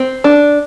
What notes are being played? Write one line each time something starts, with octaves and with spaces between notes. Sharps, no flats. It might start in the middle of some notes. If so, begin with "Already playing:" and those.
Already playing: C4
D4